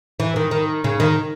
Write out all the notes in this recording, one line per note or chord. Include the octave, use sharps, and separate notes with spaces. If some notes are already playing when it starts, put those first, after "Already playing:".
E3
D#3
D#3
C#3
D#3